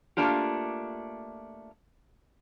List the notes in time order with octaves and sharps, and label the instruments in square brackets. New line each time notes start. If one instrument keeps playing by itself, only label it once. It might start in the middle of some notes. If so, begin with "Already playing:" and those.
[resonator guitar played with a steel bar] A3 A#3 D4 F4 G4